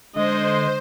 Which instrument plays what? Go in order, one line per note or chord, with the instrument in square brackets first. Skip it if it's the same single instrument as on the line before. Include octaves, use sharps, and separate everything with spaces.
[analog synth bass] D3 [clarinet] G#3 [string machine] C5 [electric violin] D#5